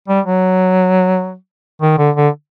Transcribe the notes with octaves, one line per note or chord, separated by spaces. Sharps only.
G3
F#3
D#3
D3
D3